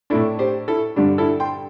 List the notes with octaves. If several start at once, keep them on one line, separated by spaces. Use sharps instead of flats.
A2 A3 D4 E4 A4
G4 C5
E4 A4
G2 D3 G3 D4
E4 A4
G5 C6